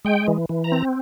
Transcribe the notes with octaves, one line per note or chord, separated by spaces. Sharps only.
G#3 G5
E3
E3
A#5
C4